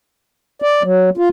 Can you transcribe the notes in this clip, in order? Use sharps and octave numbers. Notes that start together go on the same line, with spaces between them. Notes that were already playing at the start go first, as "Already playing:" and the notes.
D5
F#3
F4